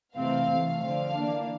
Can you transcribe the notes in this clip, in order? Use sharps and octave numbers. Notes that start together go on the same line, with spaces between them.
C3 E3 A3 C4 F5
C3 E3 A3
D3 F3 C4 F5
E3 A#3 D4